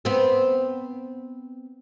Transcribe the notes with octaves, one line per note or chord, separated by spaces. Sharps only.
B3 C4